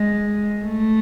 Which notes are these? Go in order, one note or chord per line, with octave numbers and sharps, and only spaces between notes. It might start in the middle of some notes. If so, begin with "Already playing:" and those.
Already playing: G#3
A3